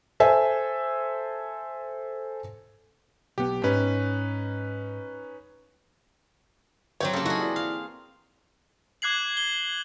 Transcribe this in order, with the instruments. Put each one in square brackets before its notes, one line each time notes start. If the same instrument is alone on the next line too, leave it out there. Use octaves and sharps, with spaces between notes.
[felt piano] A4 C5 E5 G#5
[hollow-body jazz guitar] B1 B3 [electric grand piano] G4
[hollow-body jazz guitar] G#2 [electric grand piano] C#4 D#4 B4
[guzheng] F#3 C4 G4 [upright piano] C#5
[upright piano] C#3 [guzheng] A#3 A4
[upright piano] D#4 E4 C#6 [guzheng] F#4 G#4
[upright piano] E3 E4 D5
[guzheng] F5
[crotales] D6 F#6 G#6 C7 F#7
G7